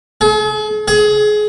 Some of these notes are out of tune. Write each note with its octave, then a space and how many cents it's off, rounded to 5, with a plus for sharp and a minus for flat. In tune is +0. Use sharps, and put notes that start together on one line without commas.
G#4 +45
G#4 +25